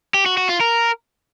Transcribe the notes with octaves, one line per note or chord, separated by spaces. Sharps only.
G4
F#4
F#4
F4
A#4